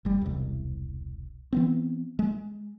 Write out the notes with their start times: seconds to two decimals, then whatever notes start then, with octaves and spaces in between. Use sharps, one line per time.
0.05 G1 G3
0.21 E1 C2
1.53 E3 B3 C4
2.19 G#3